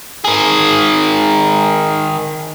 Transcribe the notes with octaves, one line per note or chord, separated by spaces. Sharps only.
D#3 G#4